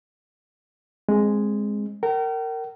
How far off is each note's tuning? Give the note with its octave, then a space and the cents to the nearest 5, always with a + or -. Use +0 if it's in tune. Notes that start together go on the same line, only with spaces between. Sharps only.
G#3 +0 C4 +25
A#4 -20 G5 -40